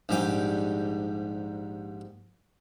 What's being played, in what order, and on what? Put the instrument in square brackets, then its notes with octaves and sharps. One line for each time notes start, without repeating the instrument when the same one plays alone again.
[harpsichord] A#1 G#2 G3 G#5 D6